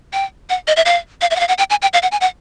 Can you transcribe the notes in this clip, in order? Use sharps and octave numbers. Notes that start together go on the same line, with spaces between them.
G5
F#5
D#5
E5
F5
F5
E5
F#5
F5
F#5
G5
G#5
G5
F5
F#5
G#5
F#5